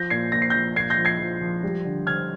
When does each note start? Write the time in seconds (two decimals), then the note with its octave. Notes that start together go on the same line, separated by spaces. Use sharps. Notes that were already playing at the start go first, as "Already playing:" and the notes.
Already playing: F3 G6 A#6
0.10 A#2 G#6 C7
0.32 A#2 A#6
0.42 C7
0.50 F3 G6 A#6
0.76 A#2 G#6 C7
0.90 G6 A#6
0.98 F3
1.05 G#6 C7
1.19 F3
1.41 F3
1.63 G3
1.85 D3
2.07 D3 F6 G#6